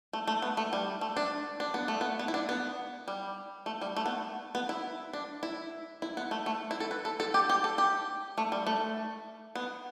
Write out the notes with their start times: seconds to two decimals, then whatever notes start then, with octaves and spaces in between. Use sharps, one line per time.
0.13 A3
0.27 A3
0.42 B3
0.57 A3
0.73 G3
1.01 A3
1.17 D4
1.60 D4
1.74 B3
1.88 A3
2.01 B3
2.19 B3
2.28 E4
2.34 D4
2.49 B3
3.08 G3
3.66 A3
3.81 G3
3.96 A3
4.06 B3
4.55 B3
4.69 E4
5.13 D4
5.43 E4
6.02 E4
6.17 B3
6.31 A3
6.46 A3
6.71 E4
6.80 A4
6.91 B4
7.05 A4
7.20 A4
7.34 G4
7.49 G4
7.64 A4
7.78 G4
8.38 A3
8.52 G3
8.66 A3
9.55 B3